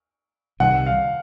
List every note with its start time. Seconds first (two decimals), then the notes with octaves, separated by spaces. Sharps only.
0.60 C2 C3 D#3 G3 F#5
0.86 F5